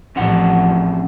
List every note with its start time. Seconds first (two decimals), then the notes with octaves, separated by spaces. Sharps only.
0.16 A1 C3 F3 C#4 F#5